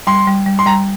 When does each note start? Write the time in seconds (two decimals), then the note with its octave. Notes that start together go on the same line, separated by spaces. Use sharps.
0.07 G3 C6
0.27 G3
0.46 G3
0.59 C6
0.66 G3 A#5